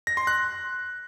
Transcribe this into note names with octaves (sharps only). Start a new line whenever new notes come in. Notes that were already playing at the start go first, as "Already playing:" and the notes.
A#6
C6
F#6